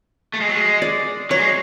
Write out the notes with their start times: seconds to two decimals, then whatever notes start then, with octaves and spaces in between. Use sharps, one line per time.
0.34 A3
0.40 G#3
0.48 F#3
0.55 G#3
0.82 D5
1.30 F#3 C#5
1.39 G#3